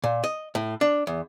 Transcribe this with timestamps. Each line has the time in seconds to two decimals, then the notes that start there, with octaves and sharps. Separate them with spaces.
0.04 A#2
0.24 D#5
0.55 A2
0.81 D4
1.07 E2